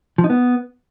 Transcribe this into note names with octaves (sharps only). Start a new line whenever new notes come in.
F3
D#4
B3